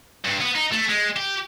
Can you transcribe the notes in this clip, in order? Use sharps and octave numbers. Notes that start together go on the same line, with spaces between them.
G2
B3
D#4
A3
G#3
G4